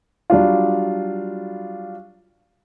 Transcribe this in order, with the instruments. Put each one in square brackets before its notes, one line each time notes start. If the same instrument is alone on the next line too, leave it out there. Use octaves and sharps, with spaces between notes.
[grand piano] F#3 G3 D4 F4